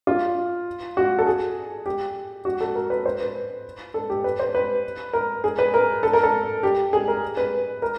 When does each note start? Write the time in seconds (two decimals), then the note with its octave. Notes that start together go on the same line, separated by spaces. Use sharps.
0.07 F4
0.97 F#4
1.19 A4
1.27 G#4
1.86 G4
2.45 F#4
2.61 A4
2.75 A#4
2.90 B4
3.05 C5
3.20 B4
3.94 A4
4.10 G4
4.24 B4
4.39 C5
4.55 B4
5.13 A#4
5.44 G#4
5.59 B4
5.74 A#4
6.03 A4
6.13 A#4
6.23 A4
6.63 G4
6.93 G#4
7.08 A#4
7.37 B4
7.82 A#4